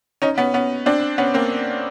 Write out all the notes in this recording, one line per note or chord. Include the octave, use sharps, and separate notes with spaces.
C#4 D#4
B3 C#4
B3 C#4
C4 D4
B3 C#4
A#3 C4